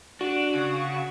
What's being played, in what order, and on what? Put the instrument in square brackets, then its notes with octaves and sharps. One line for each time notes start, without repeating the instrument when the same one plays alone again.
[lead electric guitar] D4 [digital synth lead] F#4
[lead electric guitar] C#3